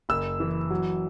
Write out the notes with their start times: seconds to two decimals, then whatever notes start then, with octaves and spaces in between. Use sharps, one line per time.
0.09 F#1 E6
0.40 E3
0.70 F#3